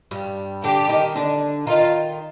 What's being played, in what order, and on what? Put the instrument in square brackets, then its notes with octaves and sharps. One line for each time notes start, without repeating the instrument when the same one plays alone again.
[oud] G2 G3
[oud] D3 D4 [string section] G4
[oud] D#3 D#4
D3 D4
[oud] D#3 D#4 [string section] F4